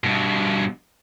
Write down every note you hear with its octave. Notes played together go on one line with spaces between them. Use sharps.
G2 B2